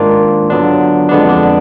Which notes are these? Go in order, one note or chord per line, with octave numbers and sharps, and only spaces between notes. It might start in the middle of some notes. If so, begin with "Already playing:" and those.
Already playing: G#2 D#3 A#3 D4 F4
D3 F#3 B3 D4
F2 D3 G#3 B3 D4
D4